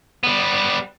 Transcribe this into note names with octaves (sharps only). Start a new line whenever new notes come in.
G3 B3